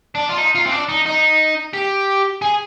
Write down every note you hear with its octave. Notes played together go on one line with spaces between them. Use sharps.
D4
F4
D#4
F4
C4
D4
D#4
D#4
G4
G#4